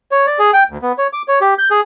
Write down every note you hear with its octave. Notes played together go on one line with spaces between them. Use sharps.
C#5
D5
G#4
G5
D2
B3
C#5
D6
C#5
G4
G6
G#4